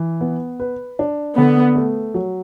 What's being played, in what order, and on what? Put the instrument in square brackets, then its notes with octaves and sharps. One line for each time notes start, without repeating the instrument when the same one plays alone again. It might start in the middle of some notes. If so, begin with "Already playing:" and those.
Already playing: [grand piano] E3
B3
B4
D4
[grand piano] D3 [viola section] B3
[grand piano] A3
F#3